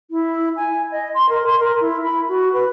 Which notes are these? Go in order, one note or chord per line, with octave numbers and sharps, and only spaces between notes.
E4
G#5
D#5
C6
A#4
C6
A#4
E4
B5
F#4
B4